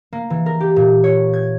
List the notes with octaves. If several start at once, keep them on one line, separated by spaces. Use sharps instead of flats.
A#3
E3
A#4
G4
A#2
C#5
G#6